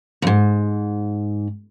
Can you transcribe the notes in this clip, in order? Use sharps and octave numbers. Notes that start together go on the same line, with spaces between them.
D#2 G#2